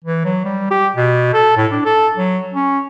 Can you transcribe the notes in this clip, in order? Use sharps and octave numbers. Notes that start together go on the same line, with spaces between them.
E3
F#3
G3
G4
B2
A4
A2
D4
A4
F#3
C#4